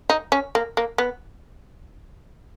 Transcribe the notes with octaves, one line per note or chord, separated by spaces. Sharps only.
D#4
C#4
A#3
A#3
B3